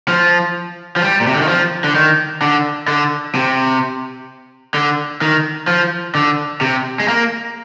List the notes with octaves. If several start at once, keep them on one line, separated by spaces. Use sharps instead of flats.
F3
F3
G3
A#2
C3
D3
D#3
F3
D3
D#3
D3
D3
C3
D3
D#3
F3
D3
C3
G#3
A#3